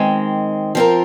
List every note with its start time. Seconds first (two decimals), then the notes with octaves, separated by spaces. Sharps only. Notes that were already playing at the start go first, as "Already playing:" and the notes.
Already playing: D#3 G#3 C4
0.75 F3 C4 F4 A#4